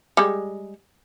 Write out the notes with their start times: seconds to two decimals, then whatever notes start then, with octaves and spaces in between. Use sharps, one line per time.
0.17 G3 G#3